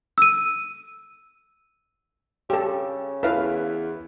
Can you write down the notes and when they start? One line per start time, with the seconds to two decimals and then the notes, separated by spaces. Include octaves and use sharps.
0.18 E6 D#7
2.50 C#3 G4 A4
3.23 E2 E4 A4 B4 F5